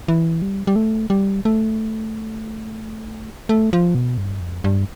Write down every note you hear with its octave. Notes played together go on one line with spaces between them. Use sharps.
E3
G3
G3
A3
G3
A3
A3
F3
B2
G2
F2
G2